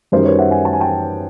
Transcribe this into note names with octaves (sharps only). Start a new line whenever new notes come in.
F#2 D#3 G3 A#4 C5
B4 C#5
E5 F#5
F#5 G#5
A5
G#5
G5 A5